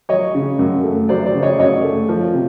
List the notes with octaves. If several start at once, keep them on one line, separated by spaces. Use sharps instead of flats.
F#3 C#5 D#5
C#3
F#2
A3
F#3 C5 D5
C5 D5
C#3
C#5 D#5
F#2 C#5 D#5
A3
F3
C3